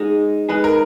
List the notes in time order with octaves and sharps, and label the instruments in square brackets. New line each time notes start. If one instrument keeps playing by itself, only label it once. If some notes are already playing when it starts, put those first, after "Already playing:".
Already playing: [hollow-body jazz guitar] G#3 D#4 G#4
[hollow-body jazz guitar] G#3 D#4 G#4 [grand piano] B4
[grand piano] A#4